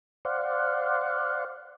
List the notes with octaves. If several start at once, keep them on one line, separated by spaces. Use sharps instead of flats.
C5 D5 F5 F#5